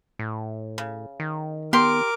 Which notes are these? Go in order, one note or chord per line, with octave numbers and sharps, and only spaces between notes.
A2
C#3
D#3
B3 G4 A#4 C6 D6